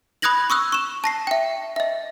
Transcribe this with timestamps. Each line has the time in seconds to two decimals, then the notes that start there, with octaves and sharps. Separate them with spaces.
0.22 B5 D#6 F#6 G#6 A#6 F#7
0.50 C#6 D#6 E6 F#6
0.72 C#6 E7
1.04 A5 A#6 C7
1.27 E5 G5
1.76 D#5 E5